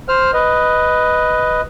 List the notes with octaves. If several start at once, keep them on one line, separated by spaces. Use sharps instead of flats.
C5 F6
B4 D#5